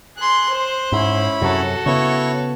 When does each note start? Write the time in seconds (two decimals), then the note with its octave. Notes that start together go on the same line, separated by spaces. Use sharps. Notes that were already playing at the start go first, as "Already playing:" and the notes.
0.17 G#4 C6 F#6
0.49 C5
0.92 G#2 C#4 E4 B5
1.42 F#2 C3 F#4 A4
1.86 C#3 B3 E4 C#5 C#6